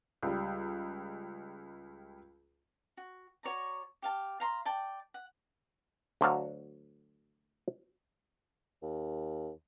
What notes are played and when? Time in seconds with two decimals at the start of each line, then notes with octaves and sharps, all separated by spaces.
0.23 C#2 G3
2.97 F#4
3.43 F#4 C#5 D5 A#5
4.02 G4 F5 A5
4.40 F5 A#5 C6
4.65 D5 G5 A5
5.14 F#5
6.21 D2 D3 F#3 F#4 F5 A5
8.83 D#2